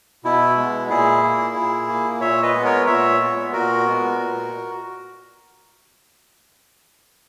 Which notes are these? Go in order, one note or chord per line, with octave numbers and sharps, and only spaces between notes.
B2 E4
G#3 B3
A#2 E4 G#4
A#3
A#2
A#3
A#2 C#5 E5
B4 D#5
G#3 B3
A#4 C#5
A#2 C#5 E5
G#3 B3
A#2 F#4 A#4
G#3 B3
A#2